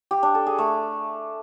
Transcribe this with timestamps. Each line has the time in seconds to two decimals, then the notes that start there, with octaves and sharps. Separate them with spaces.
0.11 G4
0.23 D4
0.35 A4
0.47 G#4
0.58 A3